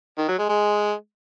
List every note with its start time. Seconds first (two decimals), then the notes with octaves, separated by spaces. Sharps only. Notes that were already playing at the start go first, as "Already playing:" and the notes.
0.18 D#3
0.28 F#3
0.39 G#3
0.49 G#3